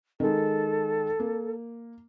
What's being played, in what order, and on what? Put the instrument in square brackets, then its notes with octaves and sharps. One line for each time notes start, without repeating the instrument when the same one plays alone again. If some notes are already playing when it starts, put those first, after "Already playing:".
[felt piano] D#3 G#3 [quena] A4
[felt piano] A#3